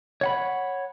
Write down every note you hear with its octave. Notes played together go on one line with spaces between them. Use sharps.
C#5 F#5 B5